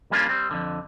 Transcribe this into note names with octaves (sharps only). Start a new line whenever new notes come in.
G3 A#3 C#4 D4 F4
G3 C4
F2 D3